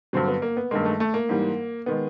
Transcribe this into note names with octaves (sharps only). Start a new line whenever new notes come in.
G2 D3 F#3 C4
B3
A#3
B3
G2 D#3 G#3 A#3
A3
A3
A#3
G#2 E3 G3
D#3 G#3 B3